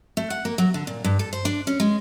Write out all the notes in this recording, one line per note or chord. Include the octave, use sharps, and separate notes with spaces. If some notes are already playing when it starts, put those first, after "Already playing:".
A3
F#5
A#3
F#3
D3
A#2
G2
A4
C5
D4
C#4
G#3